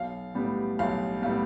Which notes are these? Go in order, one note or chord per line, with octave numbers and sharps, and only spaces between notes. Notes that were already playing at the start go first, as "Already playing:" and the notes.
Already playing: B1 F5
A2 G3 B3
B1 F5
A2 G3 B3 F5